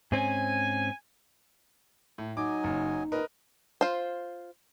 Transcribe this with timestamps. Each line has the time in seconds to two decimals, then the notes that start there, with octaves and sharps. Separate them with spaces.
0.12 G#2 C4 C#4 G#5
2.18 A2
2.37 F#3 D#4 D#5 G#5 D6
2.64 F#1
3.12 E2 A#2 A#4 B4 D#5
3.81 F4 C5